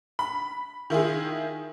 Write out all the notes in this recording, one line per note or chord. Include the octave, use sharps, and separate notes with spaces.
B5
D#3 E4 F4 G#4